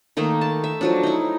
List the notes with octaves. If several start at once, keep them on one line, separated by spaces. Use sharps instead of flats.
D#3 A3 A#3 D#4
A5
E5
F3 F#3 D4
D#4 E4